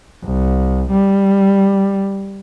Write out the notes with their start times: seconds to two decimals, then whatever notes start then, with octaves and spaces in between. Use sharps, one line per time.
0.25 C2
0.91 G3